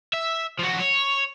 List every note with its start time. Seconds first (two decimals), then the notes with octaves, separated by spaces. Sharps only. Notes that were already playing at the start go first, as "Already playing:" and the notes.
0.14 E5
0.59 F3 F#4
0.80 C#5